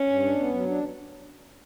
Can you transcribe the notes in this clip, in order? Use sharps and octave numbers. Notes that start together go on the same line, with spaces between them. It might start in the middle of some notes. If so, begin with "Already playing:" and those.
Already playing: C#4
G2
D4
B3
F#3
D4